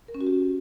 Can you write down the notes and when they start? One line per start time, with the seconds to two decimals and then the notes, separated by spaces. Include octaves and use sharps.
0.08 A#4
0.15 C#4
0.21 F#4
0.27 G4